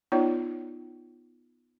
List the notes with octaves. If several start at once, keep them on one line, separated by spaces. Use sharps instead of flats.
B3 D#4 F4 C#5 D5